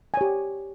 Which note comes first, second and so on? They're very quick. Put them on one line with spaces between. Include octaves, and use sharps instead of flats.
G#5 C#5 G4